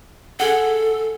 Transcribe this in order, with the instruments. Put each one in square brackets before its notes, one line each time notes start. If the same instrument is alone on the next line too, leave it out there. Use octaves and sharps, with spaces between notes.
[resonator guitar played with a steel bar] G#4 F#5 [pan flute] A4